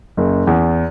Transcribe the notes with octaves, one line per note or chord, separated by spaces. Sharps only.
F#1
E2